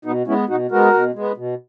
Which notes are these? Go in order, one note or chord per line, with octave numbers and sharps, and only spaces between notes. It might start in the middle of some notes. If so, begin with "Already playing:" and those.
B2 B3 D#4
G#3 B3 C#4 E4
B2 D#4 F#4
G#3 B3 F#4 A#4
B2
G#3 B3
B2